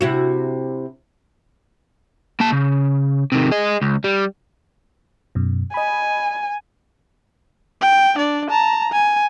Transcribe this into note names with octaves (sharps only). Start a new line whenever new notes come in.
C3 E4 F#4
A#3 A5
C#3
C3 D#3
G#4 D#5
C#2
G3
F#2 B2
D#5 G#5 B5
G5
D4 D5
A5 A#5
G#5